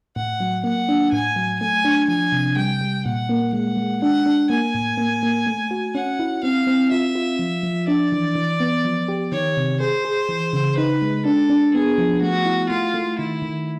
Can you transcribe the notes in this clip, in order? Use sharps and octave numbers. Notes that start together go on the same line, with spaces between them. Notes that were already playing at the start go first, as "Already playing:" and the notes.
A2 F#5
F#3
A#3 F#5
D4
A2 G#5
F#3
A3 G#5
D4
F3 G#5
C3
G3 G5
G3
A#2 F#5
A#3
G#3 F#5
G#3
D4 F#5
D4
A#3 G#5
A2
A#3
A#3
A3
F#4
C#4 F#5
E4
C4 F5
C4
F4 E5
F4
F3
F3
D4 D5
E3
E3
B3
F3
G4
D#3 C#5
C3
G#4 C5
G#4
E3
C#3
D#4 B4
G#3
D4 A4
D4
B3 G#4
F3
A3 F#4
E4
A3 F4
A3
D#3 E4
D#3